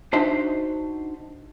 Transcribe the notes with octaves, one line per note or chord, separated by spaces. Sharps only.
D4 D#4 F#4 C5 E5